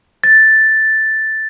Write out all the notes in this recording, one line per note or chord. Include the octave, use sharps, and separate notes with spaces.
A6